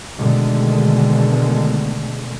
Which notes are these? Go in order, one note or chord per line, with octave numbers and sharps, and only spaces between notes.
B2 D3 D#3 G#3 A3